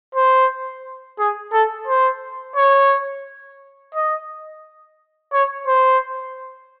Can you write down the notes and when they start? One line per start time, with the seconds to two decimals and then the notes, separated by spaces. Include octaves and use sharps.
0.15 C5
1.19 G#4
1.53 A4
1.87 C5
2.56 C#5
3.95 D#5
5.33 C#5
5.67 C5